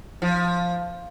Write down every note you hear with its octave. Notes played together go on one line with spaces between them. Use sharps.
F3